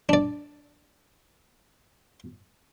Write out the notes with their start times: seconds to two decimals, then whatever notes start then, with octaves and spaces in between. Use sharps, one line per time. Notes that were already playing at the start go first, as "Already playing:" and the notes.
0.09 D4 D5